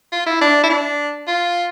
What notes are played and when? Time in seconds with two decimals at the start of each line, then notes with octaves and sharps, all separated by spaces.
0.12 F4
0.26 E4
0.41 D4
0.64 E4
0.70 D4
1.28 F4